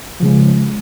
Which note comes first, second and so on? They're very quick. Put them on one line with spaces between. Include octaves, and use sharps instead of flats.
F3 C#3 G#3